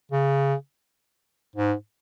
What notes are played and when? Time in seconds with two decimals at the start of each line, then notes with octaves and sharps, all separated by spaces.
0.11 C#3
1.56 G#2